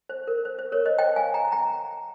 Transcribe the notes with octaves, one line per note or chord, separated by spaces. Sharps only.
C5
A#4
C5
C5
A#4 C#5
C5 D#5
D#5 G5
F5 G#5
G5 A#5
G5 A#5